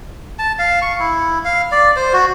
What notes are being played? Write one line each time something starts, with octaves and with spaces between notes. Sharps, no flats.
A5
F5
C#6
E4
F5
D5
C5
F#4